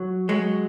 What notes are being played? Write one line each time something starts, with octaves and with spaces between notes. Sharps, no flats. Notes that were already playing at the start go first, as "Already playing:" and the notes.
Already playing: F#3
F#3 G#3